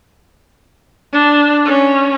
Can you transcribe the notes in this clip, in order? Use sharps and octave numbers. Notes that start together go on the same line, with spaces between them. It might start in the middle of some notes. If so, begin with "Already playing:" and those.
D4
C#4